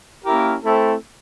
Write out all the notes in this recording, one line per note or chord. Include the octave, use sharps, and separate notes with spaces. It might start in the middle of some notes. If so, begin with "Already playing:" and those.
A#3 C#4 E4 G4 A#4
A3 C4 E4 A4